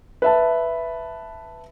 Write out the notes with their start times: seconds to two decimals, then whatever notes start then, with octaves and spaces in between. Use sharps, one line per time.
0.22 B4 E5 A5